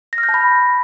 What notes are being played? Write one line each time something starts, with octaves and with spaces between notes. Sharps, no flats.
A#6
F6
G6
A5
B5